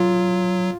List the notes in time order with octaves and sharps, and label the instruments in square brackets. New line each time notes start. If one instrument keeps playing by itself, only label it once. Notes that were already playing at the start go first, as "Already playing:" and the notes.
Already playing: [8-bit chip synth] F#3 [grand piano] F4